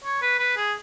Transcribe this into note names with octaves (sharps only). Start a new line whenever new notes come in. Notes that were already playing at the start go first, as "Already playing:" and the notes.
C#5
B4
B4
G#4